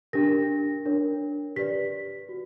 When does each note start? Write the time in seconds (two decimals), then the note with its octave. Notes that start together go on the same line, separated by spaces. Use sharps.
0.13 D4 G4 A#4 A#6
0.85 D4 A#4 C#5
1.56 G4 B4 D5 B6
2.29 F#4